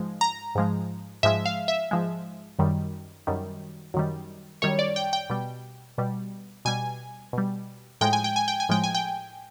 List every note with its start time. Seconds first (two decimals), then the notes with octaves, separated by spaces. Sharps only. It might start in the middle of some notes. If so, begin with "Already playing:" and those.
Already playing: G#2 F3 G#3
0.21 A#5
0.55 G#2 F3 G#3
1.23 G#2 F3 G#3 E5
1.46 F5
1.68 E5
1.91 G#2 F3 G#3
2.59 F#2 D#3 G3
3.27 F#2 D#3 G3
3.94 F#2 D#3 G3
4.62 F#2 D#3 G3 C#5
4.79 D5
4.96 G5
5.13 G5
5.30 B2 G3
5.98 B2 G3
6.65 B2 G3 G#5
7.33 B2 G3
8.01 A2 F3 G#3 G5
8.13 G#5
8.24 G5
8.36 G#5
8.48 G5
8.60 G#5
8.69 A2 F3 G#3 G5
8.84 G#5
8.95 G5